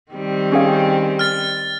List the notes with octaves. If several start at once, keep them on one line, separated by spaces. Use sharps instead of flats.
D#3 G3 C4
C#4 G#4 F5
F6 A6